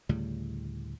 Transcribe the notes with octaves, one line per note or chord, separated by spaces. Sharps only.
D2 A2 C#3 G3